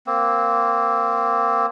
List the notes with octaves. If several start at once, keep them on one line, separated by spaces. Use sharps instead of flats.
A#3 C4